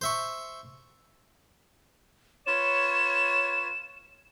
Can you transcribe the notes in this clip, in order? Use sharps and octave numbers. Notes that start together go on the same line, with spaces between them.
C5 E5 C#6
F4 B4 C#5 E7